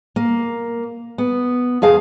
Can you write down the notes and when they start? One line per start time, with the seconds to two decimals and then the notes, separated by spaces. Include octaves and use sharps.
0.16 A#3
1.18 B3
1.82 F2 G#4 F5 A5